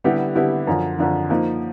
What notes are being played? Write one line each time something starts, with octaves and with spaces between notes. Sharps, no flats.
D3 G3 B3 E4 G4
D3 G3 B3 E4 G4
F#2 D3 F3
F#2 D3 F3
F3 A#3 D#4